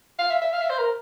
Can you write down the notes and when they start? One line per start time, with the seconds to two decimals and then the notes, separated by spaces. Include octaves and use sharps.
0.19 F5
0.30 E5
0.42 E5
0.53 F5
0.61 E5
0.69 C5
0.78 A#4